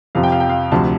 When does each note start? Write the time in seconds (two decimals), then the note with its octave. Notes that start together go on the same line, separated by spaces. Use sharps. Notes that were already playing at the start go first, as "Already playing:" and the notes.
0.15 F2 C3 F3 F5
0.23 G5
0.32 F5
0.40 G5
0.50 F5
0.72 D2 C3 F3 A5